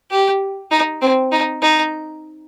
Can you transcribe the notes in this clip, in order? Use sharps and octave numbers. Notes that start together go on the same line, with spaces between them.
G4
D#4
C4
D#4
D#4